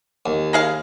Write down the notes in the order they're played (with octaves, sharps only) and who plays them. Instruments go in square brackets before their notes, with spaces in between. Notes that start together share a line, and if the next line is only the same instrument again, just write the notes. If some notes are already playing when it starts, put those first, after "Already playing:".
[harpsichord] D#2
[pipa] A#3 G#4 F5